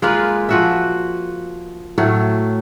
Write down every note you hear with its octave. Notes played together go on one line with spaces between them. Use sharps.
G#3 A#3 F4 B4
F3 F#4 E5
A2 F#3 A3